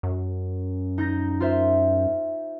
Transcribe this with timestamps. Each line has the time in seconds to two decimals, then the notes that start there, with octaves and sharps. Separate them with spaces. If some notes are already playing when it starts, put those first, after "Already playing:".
0.03 F#2
0.98 D#4 G6 A#6
1.40 F4 C5 E5